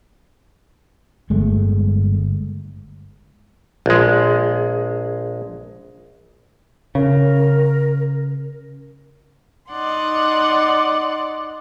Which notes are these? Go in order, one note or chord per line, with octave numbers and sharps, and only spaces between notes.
G1 G#3 A3
A#1 G#3
C#3 A#4
D#4 D5 F#5 C6